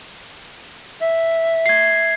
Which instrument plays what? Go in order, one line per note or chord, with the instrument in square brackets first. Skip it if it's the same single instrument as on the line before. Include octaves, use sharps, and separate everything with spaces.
[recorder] E5
[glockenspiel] G#6 C7